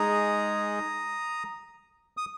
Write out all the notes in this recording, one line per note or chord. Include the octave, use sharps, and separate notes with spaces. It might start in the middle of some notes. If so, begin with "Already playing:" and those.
Already playing: G#3 D#4 G#4 A#5 D#6
D#6